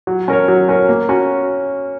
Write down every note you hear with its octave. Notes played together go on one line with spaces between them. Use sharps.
F#3
C#4 A#4 C#5
F#3
C#4 A#4 C#5
A#3
C#4 F#4